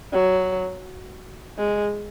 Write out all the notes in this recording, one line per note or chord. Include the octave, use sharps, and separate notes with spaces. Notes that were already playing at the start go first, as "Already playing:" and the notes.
F#3
G#3